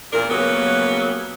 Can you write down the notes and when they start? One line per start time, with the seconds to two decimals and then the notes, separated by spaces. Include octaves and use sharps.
0.12 E2 A#2 D4 A#4
0.29 C#3 F#3 G3 A#3 B3